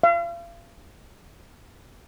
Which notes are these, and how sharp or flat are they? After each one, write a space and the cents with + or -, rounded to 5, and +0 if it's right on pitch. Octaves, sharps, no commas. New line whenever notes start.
F5 -40